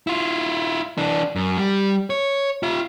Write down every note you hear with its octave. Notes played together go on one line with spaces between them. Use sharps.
E4 F4
E3 D4
F#2
G3
C#5
F4 E5